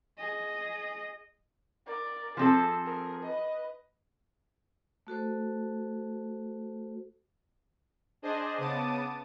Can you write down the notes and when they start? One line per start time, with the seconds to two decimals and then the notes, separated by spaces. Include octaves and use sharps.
0.17 G#4 D#5
1.86 A#4 D5
2.37 F3 C4 G#4 A4
2.85 G#4 A#4
3.23 B4 D#5
5.07 A3 F#4 A4 C5
8.22 D4 G#4 C5 D#5
8.58 C#3 B3 A5 D6 D#6 D#7